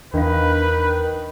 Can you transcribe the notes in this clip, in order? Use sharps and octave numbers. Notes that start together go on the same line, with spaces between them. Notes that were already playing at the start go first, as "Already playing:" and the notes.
E2 D#3 E3 D4 B4 F5